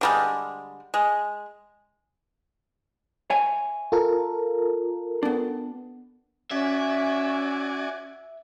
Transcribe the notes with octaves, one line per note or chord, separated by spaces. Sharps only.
D3 G3 G#3
G#3
C#5 E5 G#5
F4 A4 A#4
B3 D4
C#4 F#4 D5 E5 G#5